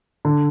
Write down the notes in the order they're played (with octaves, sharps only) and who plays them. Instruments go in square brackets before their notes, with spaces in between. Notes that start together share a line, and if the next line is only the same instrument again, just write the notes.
[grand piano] D3